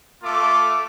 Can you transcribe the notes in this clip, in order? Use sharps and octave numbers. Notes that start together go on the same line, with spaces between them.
A3 F4 A4 D6